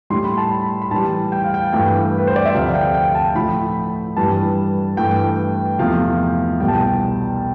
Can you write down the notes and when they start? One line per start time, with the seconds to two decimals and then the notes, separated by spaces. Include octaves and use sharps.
0.10 A2 G3 C6
0.24 B5
0.38 A5
0.51 B5
0.82 B5
0.91 A2 E3 G3 A5
1.32 G5
1.44 F5
1.54 G5
1.72 G2 E3 A3 G5
2.18 B4
2.27 C5
2.36 D5
2.46 E5
2.54 D2 C3 F3 F5
2.75 G5
2.94 G5
3.15 A5
3.35 A2 F3 A3 B5
4.17 G2 E3 G3 A5
4.97 G2 E3 A3 G5
5.79 E2 C3 F3 A3 F5
6.60 C2 B2 G3 G5
6.68 A5
6.76 G5